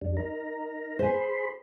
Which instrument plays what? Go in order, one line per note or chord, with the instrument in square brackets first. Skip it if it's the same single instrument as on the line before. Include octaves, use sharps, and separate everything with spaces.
[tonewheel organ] F2 G3 D4
D#4 A#4 A#5
[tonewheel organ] G#4 B5 C6 [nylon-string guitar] C5 G#5